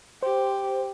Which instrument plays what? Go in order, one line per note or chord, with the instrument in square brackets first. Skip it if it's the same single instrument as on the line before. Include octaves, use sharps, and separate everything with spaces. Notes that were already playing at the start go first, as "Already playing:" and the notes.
[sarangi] G4 [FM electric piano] C5